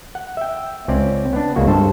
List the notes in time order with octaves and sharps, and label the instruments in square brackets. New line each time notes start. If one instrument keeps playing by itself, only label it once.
[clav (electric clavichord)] F#5
E5 G5
C#2 C4 C#4 D5
B3 D4
C#2 C#3 A#3 F#4
G2 A4 C5 A5